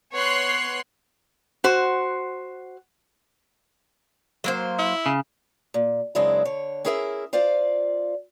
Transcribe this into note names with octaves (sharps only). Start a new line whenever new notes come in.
B3 C#5 C6 F#6 C7
F#4 C5
F#3 A#3 C5
E4
C#3
A#2
F#2 C#3 G#3 C4 D4 E4
D3 C#5
C#4 E4 G#4 A#4 C#5 E5
F4 C5 D5 F5